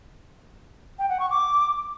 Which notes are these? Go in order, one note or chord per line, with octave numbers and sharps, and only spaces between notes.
G5
F#5
C#6
D6